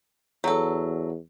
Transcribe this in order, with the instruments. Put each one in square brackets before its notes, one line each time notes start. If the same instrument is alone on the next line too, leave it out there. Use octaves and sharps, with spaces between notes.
[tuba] E2 [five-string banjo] F#3 A4